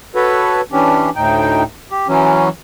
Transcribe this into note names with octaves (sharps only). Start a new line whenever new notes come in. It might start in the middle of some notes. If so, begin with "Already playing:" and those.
F#4 A4 B4 C#5
E3 C#4 D4 G4
D2 A2 D#4 G5
G4
E3 F#3 C#4